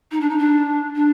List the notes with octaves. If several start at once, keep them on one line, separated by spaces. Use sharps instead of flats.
D#4
D4
D#4
D4
D4